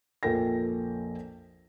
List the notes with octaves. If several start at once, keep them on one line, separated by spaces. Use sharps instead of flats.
A#1 F2 A4 A#4 G5 A#6